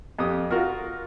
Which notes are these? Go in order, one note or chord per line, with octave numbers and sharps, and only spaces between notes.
F2 G4 D#6
F4 F#4 A#4